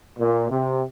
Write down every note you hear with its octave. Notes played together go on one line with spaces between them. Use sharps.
A#2
C3